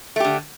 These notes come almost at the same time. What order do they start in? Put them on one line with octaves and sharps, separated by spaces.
A3 G4 D3